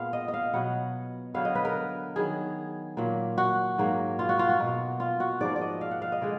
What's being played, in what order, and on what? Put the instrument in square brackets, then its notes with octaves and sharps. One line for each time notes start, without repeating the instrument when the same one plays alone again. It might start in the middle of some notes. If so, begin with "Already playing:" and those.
Already playing: [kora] A#2 G#3 B3 F5
D#5
D#5
F5
B2 F#3 B3 F#5
D3 F#3 B3 F5
D#5
B4
A#4
D#3 F#3 B3 G#4
A#2 F#3 A#3
F#4
G#2 F#3 A#3
F4
F#4
F4
F#4
B2 A#3
F4
F#4
G#2 F3 A#3 D5
D5
D#5
F5
F#5
F5
D#5
D3 G#3 D5